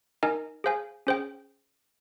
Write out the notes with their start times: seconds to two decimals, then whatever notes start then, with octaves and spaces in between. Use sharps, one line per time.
0.23 D#4 A#4 D#5 G#5
0.64 G#4 C5 F5 G#5
1.07 C#4 G#4 C5 G5